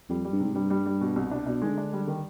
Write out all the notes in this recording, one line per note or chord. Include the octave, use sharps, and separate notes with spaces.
F2 G3
G3
G2
G#2 C3
G2 G3
G3
G3
B2
C2
D4
B2 D4
D#3 G#3
D3
D4
G3
D#3